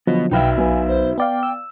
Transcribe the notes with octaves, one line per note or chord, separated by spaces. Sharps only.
D3 F3 F#3 B3 D#5
B1 D#4 F#4 B4 E5 F5 G5
B2 F#3 B3 G#5
C5
B3 D5 F5 G5
E6